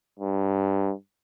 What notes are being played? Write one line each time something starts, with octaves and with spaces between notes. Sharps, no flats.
G2